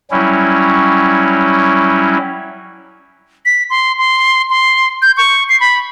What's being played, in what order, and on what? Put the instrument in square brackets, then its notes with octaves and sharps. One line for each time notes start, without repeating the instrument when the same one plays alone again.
[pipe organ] F#3 G3 C#4 E4
[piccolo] B6
C6
C6
C6
G6
C#6
C7
B5